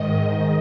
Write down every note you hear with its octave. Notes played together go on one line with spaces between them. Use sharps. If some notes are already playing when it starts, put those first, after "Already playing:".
Already playing: G#2 D#3 D#5